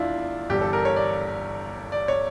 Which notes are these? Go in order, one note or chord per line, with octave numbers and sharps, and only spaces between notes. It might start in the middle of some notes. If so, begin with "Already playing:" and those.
Already playing: F1 E2 D4 E4 F4
G1 G2 E3 G3 G4
A4
A#4
C#5
D5
D5
C#5